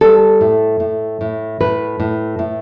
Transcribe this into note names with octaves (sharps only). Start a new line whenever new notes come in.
G3 A4
A2
A2
A2
A2 B4
A2
A2